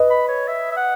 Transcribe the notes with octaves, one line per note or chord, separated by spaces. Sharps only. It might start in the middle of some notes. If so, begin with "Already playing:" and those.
Already playing: B4 D#5
B5
C#5
E5
E5
F#5